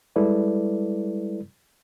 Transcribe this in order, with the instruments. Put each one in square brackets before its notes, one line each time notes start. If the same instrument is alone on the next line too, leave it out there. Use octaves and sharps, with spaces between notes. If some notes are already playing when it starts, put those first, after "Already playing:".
[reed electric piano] G3 G#3 E4 A4 B4 D5